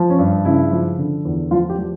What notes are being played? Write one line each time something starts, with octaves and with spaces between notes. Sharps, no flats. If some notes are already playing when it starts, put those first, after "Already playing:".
Already playing: F3
C#4
G2
C#3 E4
F3
D3
E2
F3 F4
G4
F3